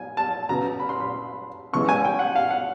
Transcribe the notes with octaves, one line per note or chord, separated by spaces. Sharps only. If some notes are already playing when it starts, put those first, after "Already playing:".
Already playing: G#5
A5
C#3 F#3 B3 A#5
B5
C6
B5
C#3 E3 G#3 C#6
G#5
G5
F#5
F5
F#5